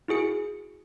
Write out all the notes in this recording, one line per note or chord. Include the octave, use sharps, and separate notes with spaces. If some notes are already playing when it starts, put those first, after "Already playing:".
E4 F#4 G#4 C#7